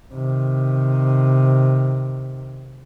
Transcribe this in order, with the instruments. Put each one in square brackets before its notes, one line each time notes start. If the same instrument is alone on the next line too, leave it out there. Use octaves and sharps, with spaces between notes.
[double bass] C3 D#3